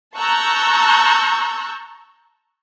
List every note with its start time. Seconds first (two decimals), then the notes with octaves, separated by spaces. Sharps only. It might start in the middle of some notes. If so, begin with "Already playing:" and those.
0.17 A5 A#5 C#6 E6 F#6 G6